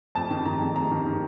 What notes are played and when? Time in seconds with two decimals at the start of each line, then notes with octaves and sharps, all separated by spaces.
0.15 F2 A5
0.31 D#3
0.46 D#3 A#5
0.61 F2
0.76 F2 A#5
0.91 D#3
1.06 D#3